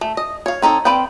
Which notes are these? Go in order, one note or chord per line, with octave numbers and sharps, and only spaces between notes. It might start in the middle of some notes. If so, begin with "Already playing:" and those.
A3
D#5
C#5 F5
C4 D#4 A4 C#5
C4 B4 D5 F5 G5